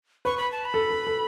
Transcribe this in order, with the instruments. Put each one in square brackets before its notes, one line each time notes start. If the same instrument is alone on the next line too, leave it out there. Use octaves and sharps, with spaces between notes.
[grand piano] B4 [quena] C#6
[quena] B5
A5
B5
[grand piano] A4
A4
A4